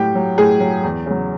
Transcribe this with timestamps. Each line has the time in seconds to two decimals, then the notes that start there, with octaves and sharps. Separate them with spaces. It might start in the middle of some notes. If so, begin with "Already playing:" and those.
Already playing: A2 F#3 G4
0.15 F#3
0.38 A2 G#4
0.60 F#3
0.83 E2
1.06 C#3 F#3